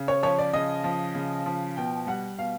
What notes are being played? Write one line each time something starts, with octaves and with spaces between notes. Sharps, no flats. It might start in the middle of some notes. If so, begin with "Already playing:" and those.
Already playing: C#3
C#5
F3 C#5
D5
C#3 D#5
F3
C#3
F3
B2 G5
G3 F#5
B2 F5